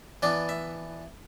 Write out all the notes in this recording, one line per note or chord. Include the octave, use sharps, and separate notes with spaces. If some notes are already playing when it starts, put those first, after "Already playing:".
E3 B3 D4 D5
E5